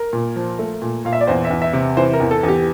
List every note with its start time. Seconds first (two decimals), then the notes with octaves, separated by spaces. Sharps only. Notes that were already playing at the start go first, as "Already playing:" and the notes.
Already playing: A#4
0.13 A#2
0.36 F3
0.59 A3
0.82 A#2
1.05 A#2 F5
1.13 E5
1.21 D5
1.27 E2 C5
1.45 E5
1.50 E2
1.62 E5
1.73 C3
1.97 E3 C5
2.14 A#4
2.20 E2
2.31 A4
2.43 E2 G4